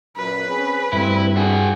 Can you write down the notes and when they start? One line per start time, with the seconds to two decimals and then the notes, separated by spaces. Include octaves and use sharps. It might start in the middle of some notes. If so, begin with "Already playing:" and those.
0.17 F#2 A#2 B4
0.48 C4 C#4 G#4
0.93 D2 G2 D3 C4 E4
1.37 D4 F#4 G#4